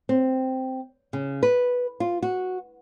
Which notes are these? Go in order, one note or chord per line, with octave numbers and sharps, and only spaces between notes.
C4
C#3
B4
F4
F#4